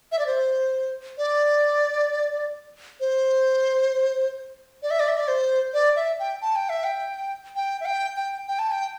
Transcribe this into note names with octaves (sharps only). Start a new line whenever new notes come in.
E5
D5
C5
D5
C5
D5
E5
D5
E5
D5
C5
D5
E5
G5
A5
G5
E5
G5
G5
E5
G5
G5
G5
A5
G5